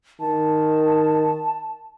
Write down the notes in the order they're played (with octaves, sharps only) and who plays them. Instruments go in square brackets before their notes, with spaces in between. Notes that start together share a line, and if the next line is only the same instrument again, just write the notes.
[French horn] D#3 [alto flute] A5